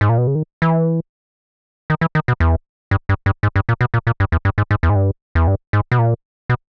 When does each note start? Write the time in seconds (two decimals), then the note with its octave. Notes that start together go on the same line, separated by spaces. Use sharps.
0.01 G#2
0.09 A#2
0.18 B2
0.27 C#3
0.35 D#3
0.62 E3
1.90 D#3
2.01 E3
2.15 D#3
2.28 B2
2.40 E2
2.91 G2
3.09 G2
3.26 G2
3.43 G#2
3.56 G2
3.69 A#2
3.81 B2
3.94 A#2
4.07 A#2
4.20 G2
4.32 E2
4.45 G2
4.58 G#2
4.71 G#2
4.83 E2
4.90 G#2
4.96 G2
5.35 E2
5.47 G2
5.73 G#2
5.92 B2
5.99 A#2
6.50 B2